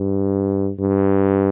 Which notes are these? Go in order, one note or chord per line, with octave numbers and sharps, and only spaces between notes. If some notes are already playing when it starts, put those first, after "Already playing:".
Already playing: G2
G2